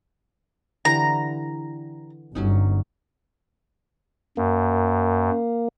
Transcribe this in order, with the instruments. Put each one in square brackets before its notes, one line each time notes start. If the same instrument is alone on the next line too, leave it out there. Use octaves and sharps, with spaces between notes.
[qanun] D3 E3 G4 [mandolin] A#5
[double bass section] G1 [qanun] F#3 C#4 D#4
[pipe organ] F#2 [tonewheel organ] A#3